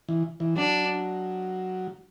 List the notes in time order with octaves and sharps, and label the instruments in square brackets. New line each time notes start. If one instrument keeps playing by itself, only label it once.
[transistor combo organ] E3
E3
[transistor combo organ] F#3 [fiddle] D4